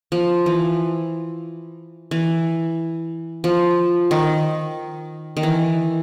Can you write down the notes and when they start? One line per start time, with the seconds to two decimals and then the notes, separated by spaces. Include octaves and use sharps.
0.12 F3
0.46 E3
2.11 E3
3.44 F3
4.11 D#3
5.37 D#3
5.43 E3